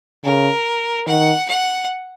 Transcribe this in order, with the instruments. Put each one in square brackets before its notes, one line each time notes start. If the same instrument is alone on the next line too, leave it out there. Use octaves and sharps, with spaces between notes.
[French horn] C#3 [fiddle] A#4
[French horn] D#3 [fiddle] F#5
[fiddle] F#5